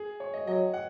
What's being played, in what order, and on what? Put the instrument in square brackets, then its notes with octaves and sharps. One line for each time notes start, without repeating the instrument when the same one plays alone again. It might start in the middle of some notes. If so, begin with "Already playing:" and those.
Already playing: [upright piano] G#4
C#5
D#5
[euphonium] F#3 [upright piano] D#5
[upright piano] F#5